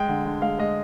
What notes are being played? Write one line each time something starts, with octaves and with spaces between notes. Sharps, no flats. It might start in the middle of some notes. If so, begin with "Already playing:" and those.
Already playing: G#3 G5
D3
D3
G#3 F5
G#3 D#5